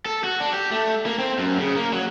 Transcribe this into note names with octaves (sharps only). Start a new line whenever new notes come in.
A4
F#4
D4
G4
A3
A#3
C4
F#2
C#3
A#3
F#3